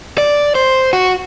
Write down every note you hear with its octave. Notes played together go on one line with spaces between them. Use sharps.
D5
C5
F#4